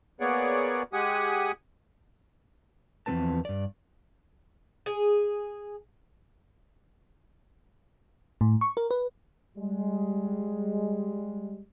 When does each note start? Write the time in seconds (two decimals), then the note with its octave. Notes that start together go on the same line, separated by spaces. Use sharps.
0.20 A#3 B3 G#4 C#5 D5 F#5
0.93 G#3 G4 F#5 G#5 D#6
3.06 E2 F3 G3 C4 B4 A5
3.45 G2 D5
4.86 G#4
8.41 A2
8.61 C#6
8.77 A#4
8.91 B4
9.58 G3 G#3